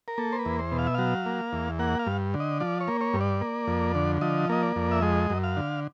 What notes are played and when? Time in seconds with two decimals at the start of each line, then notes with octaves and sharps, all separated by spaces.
0.08 A#4
0.18 A#3 A4
0.32 C5
0.39 B4
0.45 E2
0.59 C5
0.72 B2
0.79 F5
0.87 E5
0.94 F#3 F5
1.26 A#3
1.53 E2
1.79 A#3 F#5
1.99 F5
2.07 G2
2.34 D3
2.40 D#5
2.60 F3 D5
2.81 C#5
2.88 A#3
3.01 C#5
3.14 G2
3.21 D5
3.41 A#3
3.67 F2
3.95 D3
4.21 F3 D#5
4.49 A#3 D#5
4.63 D5
4.76 F2
4.91 E5
5.02 G#3 D#5
5.30 F#2
5.44 F5
5.57 D3